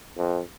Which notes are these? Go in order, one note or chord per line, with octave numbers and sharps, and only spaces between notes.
F2